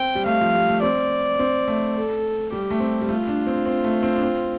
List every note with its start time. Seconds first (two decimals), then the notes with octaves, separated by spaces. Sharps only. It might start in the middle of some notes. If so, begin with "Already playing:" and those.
Already playing: C4 G5
0.15 G3
0.25 A3 F5
0.41 F3
0.55 G3
0.69 A3
0.82 C4 D5
1.39 C4
1.68 A3
1.95 A4
2.52 G3 G4
2.71 A3
2.80 C4
3.01 G3
3.09 A3 F4
3.28 D4
3.47 C4
3.66 C4
3.84 A3
4.03 C4
4.16 D4
4.22 C4